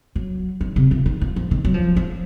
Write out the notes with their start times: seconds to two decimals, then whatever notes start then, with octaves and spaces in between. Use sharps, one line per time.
0.15 F#3
0.61 D#3
0.76 C3
0.91 F3
1.06 D#3
1.21 F3
1.36 F3
1.51 D#3
1.65 F#3
1.74 F3
1.96 F3